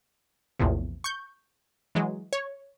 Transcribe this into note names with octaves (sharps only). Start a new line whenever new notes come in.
A#1 E2 A2 C3
C#6 G6
E3 F#3 G#3
C#5